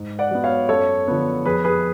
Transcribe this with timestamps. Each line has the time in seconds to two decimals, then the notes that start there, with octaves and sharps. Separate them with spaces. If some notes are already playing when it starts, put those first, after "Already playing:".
Already playing: G#2
0.19 D5 F#5
0.31 F#3 B3
0.44 C#5 F5
0.69 F#2 A4 C#5
1.08 D3 F3 B3
1.45 F2 G#4 B4
1.64 G#4 B4